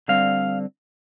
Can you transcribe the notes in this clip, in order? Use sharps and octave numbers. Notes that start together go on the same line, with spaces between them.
D3 G3 C4 F5